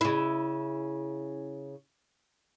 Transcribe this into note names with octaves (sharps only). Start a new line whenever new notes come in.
C#3 E4